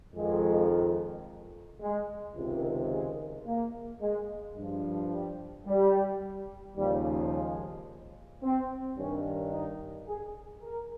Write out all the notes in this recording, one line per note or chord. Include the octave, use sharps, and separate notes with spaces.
F2 D#3 G#3
G#3
C#2 C3 D#3
G#3
A#3
G#3
G2 F3
G3
G3
D#2 C#3 F3 G3
G#3
C4
G2 D#3 C#4
D#4
G#4
A#4